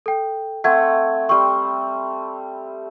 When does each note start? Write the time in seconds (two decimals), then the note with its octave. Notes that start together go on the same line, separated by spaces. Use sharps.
0.06 A4 G5
0.64 A3 C4 F#5 G#6
1.29 G3 C4 C#6